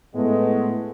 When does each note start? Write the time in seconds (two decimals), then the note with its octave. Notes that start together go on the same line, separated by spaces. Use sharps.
0.15 A2 G#3 A3 B3